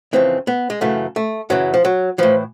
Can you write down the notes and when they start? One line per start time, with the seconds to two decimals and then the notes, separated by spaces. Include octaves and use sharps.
0.13 F2 C#3 E3 C4
0.47 B3
0.70 G#3
0.81 F#2 C#3 E3 A3
1.16 A3
1.50 F#2 C#3 E3 F#3
1.74 F3
1.85 F#3
2.18 A2 E3 F3